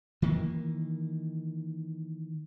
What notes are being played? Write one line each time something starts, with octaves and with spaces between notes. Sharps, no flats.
D#3 E3 A3 A#3